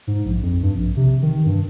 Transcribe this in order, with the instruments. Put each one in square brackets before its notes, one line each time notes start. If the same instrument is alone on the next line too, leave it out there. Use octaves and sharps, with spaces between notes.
[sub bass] G#2
A#1
F2
G2
A#1
C3
D#3
G2